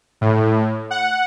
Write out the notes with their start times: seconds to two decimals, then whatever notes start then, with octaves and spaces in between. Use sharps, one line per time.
0.21 A2
0.91 F#5